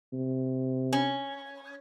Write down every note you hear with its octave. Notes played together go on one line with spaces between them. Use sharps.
C3
C#4